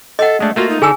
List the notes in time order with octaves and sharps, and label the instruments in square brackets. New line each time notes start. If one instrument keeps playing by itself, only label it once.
[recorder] A4 [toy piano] D#5 F#5
[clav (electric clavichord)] G#3 D4 [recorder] A3
[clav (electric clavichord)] A3 A#3 F4 [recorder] F#4
[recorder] D#4
[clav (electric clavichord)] D3 A4 [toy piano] G#4 G#5 E6